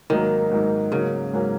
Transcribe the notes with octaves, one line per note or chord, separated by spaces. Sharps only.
G#2 D#3 F#3 A#3 D#4
G#2 F#3 A#3 D#4
G#2 C#3 F#3 A#3 C#4
G#2 F#3 A#3 C#4